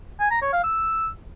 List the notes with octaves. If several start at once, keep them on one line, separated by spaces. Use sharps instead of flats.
G#5
A#5
C#5
F5
E6